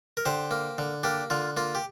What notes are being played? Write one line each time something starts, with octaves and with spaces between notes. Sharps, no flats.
A#4
D3 G4 C5
A#3
D3
A#3 D4 G4
D3 F4
A#3 F4
G4